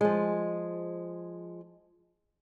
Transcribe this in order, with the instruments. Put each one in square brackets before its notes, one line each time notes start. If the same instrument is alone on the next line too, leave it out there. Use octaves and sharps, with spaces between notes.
[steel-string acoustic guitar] F3 G#3